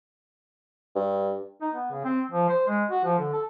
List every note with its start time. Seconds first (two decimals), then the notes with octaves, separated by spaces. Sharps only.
0.95 G2
1.61 D#4
1.74 B3
1.91 C#3
2.04 C4
2.31 F3
2.50 C5
2.68 G#3
2.91 F#4
3.04 F3
3.19 D3
3.33 A4